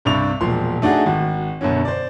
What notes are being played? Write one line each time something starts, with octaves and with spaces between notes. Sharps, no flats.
C2 G2 C3 D5 C#6 F7
E1 A#2 F3 C6
A3 D4 D#4 F#4 G#4
G#1 F#4
F#2 B2 D3 C#4
C5 D5